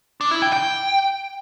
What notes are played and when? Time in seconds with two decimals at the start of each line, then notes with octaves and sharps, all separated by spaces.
0.21 D4
0.31 E4
0.42 G5
0.53 G5